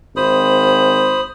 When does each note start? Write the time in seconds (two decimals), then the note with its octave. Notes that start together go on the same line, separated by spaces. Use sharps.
0.16 G#1 C5 B5 D#6